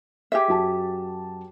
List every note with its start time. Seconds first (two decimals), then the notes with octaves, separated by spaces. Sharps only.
0.32 G4 G#4 E5
0.48 F#2 F#4 A5